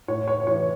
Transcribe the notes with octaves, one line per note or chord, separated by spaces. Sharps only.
A2 C#5
C#5
E3 C#5